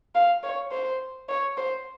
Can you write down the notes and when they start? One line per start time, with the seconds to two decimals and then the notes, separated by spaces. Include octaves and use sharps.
0.15 F5
0.43 C#5
0.71 C5
1.29 C#5
1.57 C5